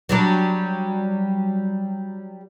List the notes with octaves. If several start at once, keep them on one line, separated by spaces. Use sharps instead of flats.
F#3 G3 D4